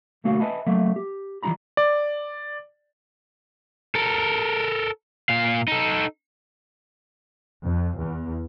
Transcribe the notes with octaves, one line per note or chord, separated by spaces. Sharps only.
B1 D3 A3 A#3 F#4 F5
B4 D#5 E5 G#5 A5 B5
F#3 A3 A#3 E5
G4
E3 F3 G3 E4 A#5 B5
D5
A4 A#4
A#2 F5
D#4 A4
F2
E2